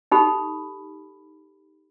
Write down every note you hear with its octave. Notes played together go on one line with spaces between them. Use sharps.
D#4 G4 A4 B5